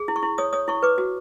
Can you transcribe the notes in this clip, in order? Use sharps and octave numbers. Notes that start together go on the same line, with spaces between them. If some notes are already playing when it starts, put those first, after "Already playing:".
Already playing: G#4
E4
C#6
E4
C#5 D#6
C#5 D#6
E4 C#6
B4 D6
F#4